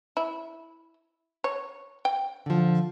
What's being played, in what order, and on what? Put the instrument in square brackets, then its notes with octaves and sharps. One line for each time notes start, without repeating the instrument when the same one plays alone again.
[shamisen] E4
C#5
G5
[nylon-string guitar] D3 F3